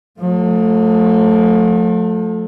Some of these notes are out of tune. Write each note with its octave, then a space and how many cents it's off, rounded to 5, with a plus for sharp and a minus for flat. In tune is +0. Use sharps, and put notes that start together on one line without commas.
F3 +45 A3 +0